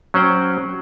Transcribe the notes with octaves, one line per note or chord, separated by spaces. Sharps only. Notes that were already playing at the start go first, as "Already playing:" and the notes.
F#3 C#4 C5 F#5 G5